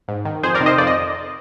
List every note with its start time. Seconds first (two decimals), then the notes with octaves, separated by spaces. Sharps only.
0.08 G#2
0.25 D#3
0.43 F2 G#4 C5
0.55 A#4 D5
0.60 C3 D#3
0.66 C5 D#5
0.78 F2 D5
0.87 D#5